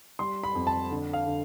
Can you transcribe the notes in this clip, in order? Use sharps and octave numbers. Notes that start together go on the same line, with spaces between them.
G3 C6
B5
F2
A5
D3
F5
D3